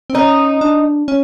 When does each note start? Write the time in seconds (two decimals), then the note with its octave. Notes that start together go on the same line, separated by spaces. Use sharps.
0.10 C4
0.15 C#4 D#4
0.61 D4
1.08 C#4